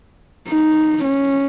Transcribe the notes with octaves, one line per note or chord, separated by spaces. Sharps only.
D#4
C#4